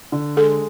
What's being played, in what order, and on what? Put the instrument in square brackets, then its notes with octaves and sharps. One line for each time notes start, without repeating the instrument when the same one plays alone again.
[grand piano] D3
[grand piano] G#3 [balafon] A4